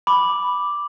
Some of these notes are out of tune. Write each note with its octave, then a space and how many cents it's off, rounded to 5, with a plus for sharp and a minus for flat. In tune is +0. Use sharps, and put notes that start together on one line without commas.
B5 +0 D6 +0